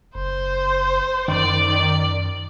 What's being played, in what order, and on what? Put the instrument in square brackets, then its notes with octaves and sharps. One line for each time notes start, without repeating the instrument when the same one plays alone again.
[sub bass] F#1 [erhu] C5
[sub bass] F#2 [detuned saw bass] D#3 [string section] D5